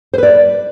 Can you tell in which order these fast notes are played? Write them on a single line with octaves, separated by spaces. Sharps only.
C5 B4 D5